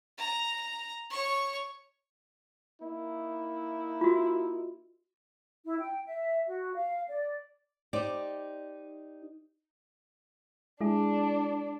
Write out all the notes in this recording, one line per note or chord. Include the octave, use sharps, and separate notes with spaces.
A#5
C#5 C#6
A#3 D#4 E4
F4 F#4
E4
G5
E5
F#4
F5
D5
D#4 G4 C5 D5
G#3 D4 E4 G#4